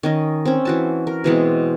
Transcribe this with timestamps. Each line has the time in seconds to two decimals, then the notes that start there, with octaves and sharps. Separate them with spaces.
0.03 D#3 C#4 D#5
0.45 C4 C#4
0.65 E3 F#4 A5
1.07 A#4
1.24 B2 E3 G#3 C4